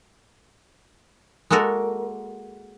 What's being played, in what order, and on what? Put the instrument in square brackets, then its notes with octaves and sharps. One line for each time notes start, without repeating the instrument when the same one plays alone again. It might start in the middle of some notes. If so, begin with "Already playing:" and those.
[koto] G#3 A#3 F#4 A4 A#4